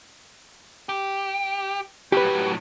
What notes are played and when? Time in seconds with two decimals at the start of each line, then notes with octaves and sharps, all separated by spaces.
0.89 G4
2.12 A2 F#3 G4 B4